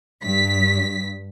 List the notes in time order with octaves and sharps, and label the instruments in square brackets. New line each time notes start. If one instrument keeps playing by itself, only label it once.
[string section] G2 B6